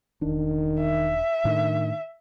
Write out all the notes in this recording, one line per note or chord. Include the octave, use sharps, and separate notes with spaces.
E1 D#3 D4
E5
A2 D#3 A3 D4